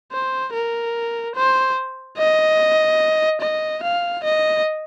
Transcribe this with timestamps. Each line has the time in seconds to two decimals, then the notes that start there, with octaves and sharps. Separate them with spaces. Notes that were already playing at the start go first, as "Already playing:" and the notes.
0.12 C5
0.54 A#4
1.35 C5
2.18 D#5
3.41 D#5
3.83 F5
4.24 D#5